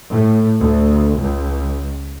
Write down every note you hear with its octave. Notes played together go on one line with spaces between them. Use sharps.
A2
D2
C#2